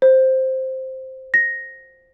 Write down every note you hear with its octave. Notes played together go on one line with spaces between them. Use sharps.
C5
A#6